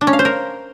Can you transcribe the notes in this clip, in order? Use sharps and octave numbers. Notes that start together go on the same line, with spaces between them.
D4
C#4
F5
C5
A#4